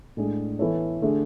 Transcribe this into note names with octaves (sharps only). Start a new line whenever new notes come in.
A2 G#3 D4 G#4
E3 B3 E4 A4 C#5
D3 A3 D4 G#4